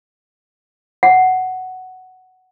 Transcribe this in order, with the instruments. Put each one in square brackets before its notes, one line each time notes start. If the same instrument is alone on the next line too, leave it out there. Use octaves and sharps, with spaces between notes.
[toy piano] F#5